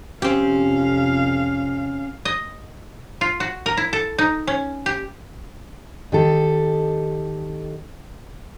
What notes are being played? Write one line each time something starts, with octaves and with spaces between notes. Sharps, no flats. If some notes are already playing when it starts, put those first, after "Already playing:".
F2 C3 C4 C#4 G4 F5
D#5
F4
F#4
A#4
E4
A4
D#4
C#4
G4
D#3 G4 A4